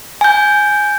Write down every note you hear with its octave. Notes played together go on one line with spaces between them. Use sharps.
G#5 G6